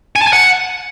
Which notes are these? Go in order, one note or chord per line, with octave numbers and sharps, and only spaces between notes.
G#5
A5
G#5
F#5